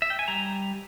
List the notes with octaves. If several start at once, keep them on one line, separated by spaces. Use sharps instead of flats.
E5
G5
G#5
G3 A#5